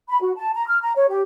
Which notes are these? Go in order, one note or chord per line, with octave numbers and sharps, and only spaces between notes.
B5
F#4
A5
A#5
F6
A#5
C#5
G4